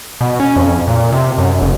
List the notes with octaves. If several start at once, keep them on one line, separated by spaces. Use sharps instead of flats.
B2
C#4
F2
A#2
C3
F#2
F#1